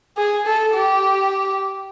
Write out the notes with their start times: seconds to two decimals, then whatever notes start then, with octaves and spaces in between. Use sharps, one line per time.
0.17 G#4
0.46 A4
0.74 G4